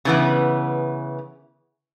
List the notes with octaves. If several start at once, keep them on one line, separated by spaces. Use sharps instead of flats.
C#3 E3 B3